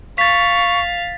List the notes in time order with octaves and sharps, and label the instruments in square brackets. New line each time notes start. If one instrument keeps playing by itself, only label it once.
[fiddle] F5 [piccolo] C#6 [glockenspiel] A6 B6